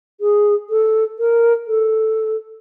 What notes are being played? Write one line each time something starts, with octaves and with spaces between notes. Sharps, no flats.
G#4
A4
A#4
A4